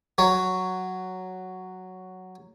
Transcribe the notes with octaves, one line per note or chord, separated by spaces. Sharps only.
F#3 C#5